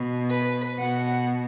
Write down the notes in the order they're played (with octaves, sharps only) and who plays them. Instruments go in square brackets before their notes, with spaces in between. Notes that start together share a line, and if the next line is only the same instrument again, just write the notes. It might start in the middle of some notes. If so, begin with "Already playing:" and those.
Already playing: [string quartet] B2
B4
B2 F#5